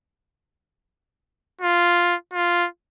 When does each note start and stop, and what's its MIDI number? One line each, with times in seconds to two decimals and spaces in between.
1.61 2.15 65
2.33 2.67 65